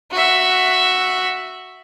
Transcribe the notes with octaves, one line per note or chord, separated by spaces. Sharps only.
F#4 E5